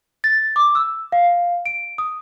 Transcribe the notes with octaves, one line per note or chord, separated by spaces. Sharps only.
A6
D6
E6
F5
D7
D#6